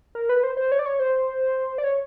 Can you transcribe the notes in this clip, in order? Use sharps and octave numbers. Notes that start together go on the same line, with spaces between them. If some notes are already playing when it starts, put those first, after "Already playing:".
A#4
B4
C5
C5
C#5
D5
C#5
C5
D5
C#5